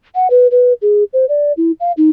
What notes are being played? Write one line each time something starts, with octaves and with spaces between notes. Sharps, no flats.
F#5
B4
B4
G#4
C5
D5
E4
F5
D#4